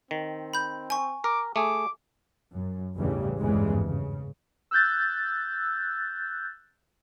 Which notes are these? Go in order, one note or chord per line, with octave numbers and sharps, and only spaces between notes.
D#3 C4
B5 G6
G#5 C#6
A#4 D6
A3 G#4 D6
F#2
A1 E2 G2 C#3 E3 G3
G#1 E2 G2 C#3 E3 G#3
C#3
E6 F#6 G6 A6